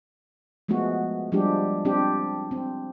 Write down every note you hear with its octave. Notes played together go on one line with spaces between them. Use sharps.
F3 G#3 A3 B3 F#4
F3 G3 G#3 D4 G4
C4 D4 G4
C4